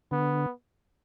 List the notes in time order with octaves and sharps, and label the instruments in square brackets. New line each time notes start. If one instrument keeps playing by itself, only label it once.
[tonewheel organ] D3 [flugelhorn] B3